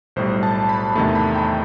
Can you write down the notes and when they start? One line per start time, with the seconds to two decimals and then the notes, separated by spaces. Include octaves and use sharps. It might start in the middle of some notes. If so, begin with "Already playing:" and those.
0.16 B1 A2 G3 C5
0.43 A5
0.69 B5
0.95 E2 C3 D#3 A3 A5
1.15 B5
1.35 G5